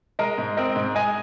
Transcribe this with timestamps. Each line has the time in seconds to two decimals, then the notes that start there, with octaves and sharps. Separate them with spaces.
0.19 G#3 A#4 D#5
0.38 G#2
0.57 C4 A#4 D#5
0.76 G#2
0.95 G#3 D#5 G#5